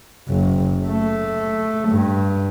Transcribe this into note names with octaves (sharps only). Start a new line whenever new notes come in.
F#1
A3
G2